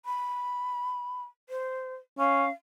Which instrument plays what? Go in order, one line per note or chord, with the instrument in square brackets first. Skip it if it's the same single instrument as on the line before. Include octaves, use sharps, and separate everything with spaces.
[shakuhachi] B5
C5
[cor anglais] C#4 [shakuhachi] F5